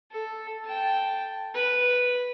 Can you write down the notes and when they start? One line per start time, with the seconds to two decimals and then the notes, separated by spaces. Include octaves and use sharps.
0.12 A4
0.65 G5 A5
1.54 B4